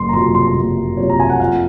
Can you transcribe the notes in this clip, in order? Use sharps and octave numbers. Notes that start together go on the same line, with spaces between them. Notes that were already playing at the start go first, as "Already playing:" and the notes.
Already playing: F#1 C6
A#5
F2 C3 F#3 C6
C6
F#1
F2 C3 F#3 C#5
A#5
G#5
F#5
F2 F5